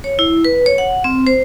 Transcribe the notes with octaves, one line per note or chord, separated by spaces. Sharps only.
C#5
E4
B4
C#5
F#5
C4
C5